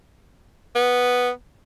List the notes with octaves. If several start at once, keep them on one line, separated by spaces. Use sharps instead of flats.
B3